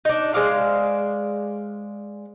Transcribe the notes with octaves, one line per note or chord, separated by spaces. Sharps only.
D4 D#4
G#3 C5 D5 F5